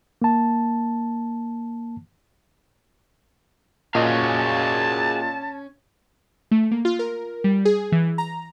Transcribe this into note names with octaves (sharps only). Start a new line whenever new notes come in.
A#3 A5
A#2 C#4 F#4 G#4 D#5 F5 A5
A3
A#3
F4
A#4
G3
G#4
E3
A#5